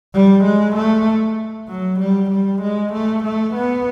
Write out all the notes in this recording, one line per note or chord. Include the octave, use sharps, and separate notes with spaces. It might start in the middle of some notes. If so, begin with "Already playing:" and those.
G3
G#3
A3
F#3
G3
G3
G#3
A3
A3
B3